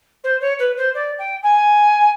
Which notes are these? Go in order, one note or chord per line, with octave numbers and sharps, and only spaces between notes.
C5
C#5
B4
C5
D5
G5
G#5